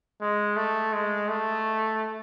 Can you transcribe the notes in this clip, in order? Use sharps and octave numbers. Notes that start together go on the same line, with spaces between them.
G#3
A3
G#3
A3